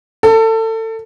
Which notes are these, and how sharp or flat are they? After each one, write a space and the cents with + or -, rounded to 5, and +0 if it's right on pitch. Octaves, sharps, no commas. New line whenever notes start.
A4 +25